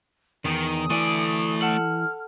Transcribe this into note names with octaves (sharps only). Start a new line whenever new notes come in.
E2 D#3 D#6
E3 A3 D5 G#5
A4 F#5 A5 F6